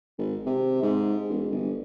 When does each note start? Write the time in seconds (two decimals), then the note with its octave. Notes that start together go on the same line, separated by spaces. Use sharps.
0.18 G#1
0.46 C3
0.82 G#2
1.29 E1
1.50 G1